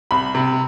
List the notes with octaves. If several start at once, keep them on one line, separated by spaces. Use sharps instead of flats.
C2 B5
C3